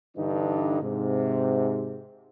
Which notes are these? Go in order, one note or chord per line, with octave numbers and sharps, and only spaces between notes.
G2 D3 E3 D4 D#4
G#2 C3